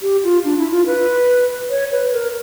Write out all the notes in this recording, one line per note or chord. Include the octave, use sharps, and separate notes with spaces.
G4
F4
D4
E4
F4
B4
C#5
B4
A#4